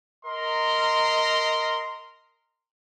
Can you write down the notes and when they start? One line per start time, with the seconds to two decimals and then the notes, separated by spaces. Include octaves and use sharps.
0.26 A#4 D#5 A#5 C6